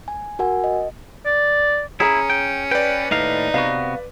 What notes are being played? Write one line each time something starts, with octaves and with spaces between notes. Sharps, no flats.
G#5
F#4 A#4 F#5 G#5
D#5
D5
C#4 E4 G#4 A#5
G5
B4 D5 G5
D#2 A2 D#4 F5
C3 B3 F#4 F5